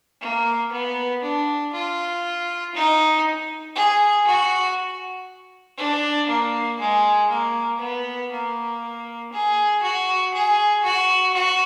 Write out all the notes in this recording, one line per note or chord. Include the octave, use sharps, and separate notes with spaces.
A#3
B3
D4
F4
D#4
G#4
F#4
D4
A#3
G#3
A#3
B3
A#3
G#4
F#4
G#4
F#4
F#4